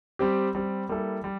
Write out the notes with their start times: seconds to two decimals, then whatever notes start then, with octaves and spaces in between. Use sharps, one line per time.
0.19 G3 C4 G4
0.55 G3 C4 G4
0.89 G3 A#3 E4 A4
1.24 G3